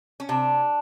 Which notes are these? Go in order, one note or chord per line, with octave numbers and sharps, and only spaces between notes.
C#4
C3 D4